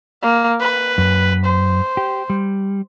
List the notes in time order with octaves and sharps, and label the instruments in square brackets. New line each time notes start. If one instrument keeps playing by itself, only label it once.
[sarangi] A#3
B4
[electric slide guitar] F#2
[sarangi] C5
[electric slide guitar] G4
G3